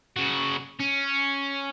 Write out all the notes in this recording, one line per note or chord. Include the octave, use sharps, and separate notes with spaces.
C#3 F#4
C#4